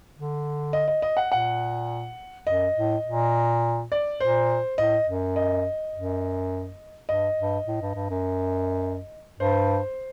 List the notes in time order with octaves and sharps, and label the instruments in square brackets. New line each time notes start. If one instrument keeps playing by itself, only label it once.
[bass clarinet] D3
[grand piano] D#5
D#5
D#5
F#5
[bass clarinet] A#2 [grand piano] F#5
[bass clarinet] F#2 [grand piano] D#5
[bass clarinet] A2
A#2
[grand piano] D5
[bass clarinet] A#2 [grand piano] C5
[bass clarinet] A2 [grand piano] D#5
[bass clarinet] F#2
[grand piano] D#5
[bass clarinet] F#2
[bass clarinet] G2 [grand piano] D#5
[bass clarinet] G2
A2
G2
G2
F#2
[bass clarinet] G2 [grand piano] C5